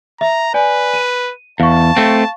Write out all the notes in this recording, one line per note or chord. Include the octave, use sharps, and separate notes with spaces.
E5 A#5
B4 D5 G#5
D#7
E2 F5 A5 C#6
A3 C4